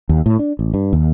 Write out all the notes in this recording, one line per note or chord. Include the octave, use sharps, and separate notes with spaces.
D#2
A2
D4
A1
G2
D#2